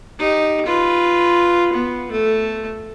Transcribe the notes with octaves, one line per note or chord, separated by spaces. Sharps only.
D#4 G4
F4 B4
B3
A3